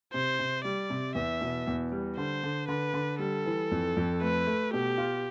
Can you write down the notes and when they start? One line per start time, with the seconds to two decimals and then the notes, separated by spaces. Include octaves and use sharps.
0.13 C3 C5
0.39 C3
0.64 G3 D5
0.90 C3
1.15 E2 E5
1.41 B2
1.67 E2
1.92 G3
2.17 D3 C5
2.43 D3
2.68 D3 B4
2.94 D3
3.19 G3 A4
3.45 E3
3.71 F2
3.97 F2
4.21 A3 B4
4.47 A3
4.73 B2 G4
4.98 F4